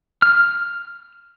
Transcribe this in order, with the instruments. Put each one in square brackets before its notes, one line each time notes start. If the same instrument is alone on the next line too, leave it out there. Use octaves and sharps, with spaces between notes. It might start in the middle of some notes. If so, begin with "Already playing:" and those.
[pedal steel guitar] F6